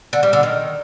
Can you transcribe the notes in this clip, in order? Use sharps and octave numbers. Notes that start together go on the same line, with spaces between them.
D3
G3
D3
D#3